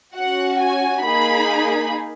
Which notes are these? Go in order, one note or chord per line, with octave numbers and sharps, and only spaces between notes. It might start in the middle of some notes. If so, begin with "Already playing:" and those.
C#4 F#4 F#5
G#5
A#3 D#4 G#4 B5